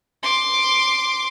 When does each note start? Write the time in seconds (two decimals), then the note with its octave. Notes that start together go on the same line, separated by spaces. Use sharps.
0.23 C6 D6